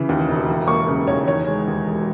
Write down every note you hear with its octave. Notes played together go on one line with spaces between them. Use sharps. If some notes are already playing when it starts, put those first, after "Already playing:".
Already playing: C#3 E3
D#2
E1
E3
A#3 C#6
C#3
E2 C#5
D#3 C#5
G#3
D#2
E1